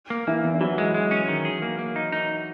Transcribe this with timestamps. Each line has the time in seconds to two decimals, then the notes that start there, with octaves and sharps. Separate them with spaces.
0.10 A#3
0.27 E3 A#3 E4
0.44 E2
0.54 E4
0.61 E3 F#3 F#4
0.78 G#3
0.94 G#3
1.11 C#4
1.28 D#3
1.45 G#4
1.62 A#3
1.79 A#3
1.96 D#4
2.12 D#4